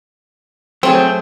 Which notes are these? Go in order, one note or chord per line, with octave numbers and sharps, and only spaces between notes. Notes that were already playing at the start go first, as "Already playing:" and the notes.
F#3 A3 C4 G#4